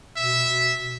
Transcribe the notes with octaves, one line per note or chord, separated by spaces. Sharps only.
B2 E5